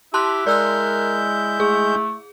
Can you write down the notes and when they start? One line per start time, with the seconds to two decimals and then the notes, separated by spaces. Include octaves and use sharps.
0.14 E4 G4 A5 C6 F#6
0.47 G#3 A#4 D5 E6 F#6 G6
1.60 A3 G#4